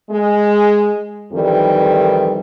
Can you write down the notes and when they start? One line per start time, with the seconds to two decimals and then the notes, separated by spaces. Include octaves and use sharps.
0.11 G#3
1.32 F2 D#3 E3 G3